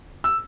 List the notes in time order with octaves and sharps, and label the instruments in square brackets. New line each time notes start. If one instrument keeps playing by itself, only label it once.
[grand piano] E6